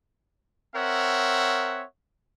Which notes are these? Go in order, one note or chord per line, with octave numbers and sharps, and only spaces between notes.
C4 A#4 C#5 E5 F#5